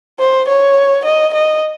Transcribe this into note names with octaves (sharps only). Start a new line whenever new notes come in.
C5
C#5
D#5
D#5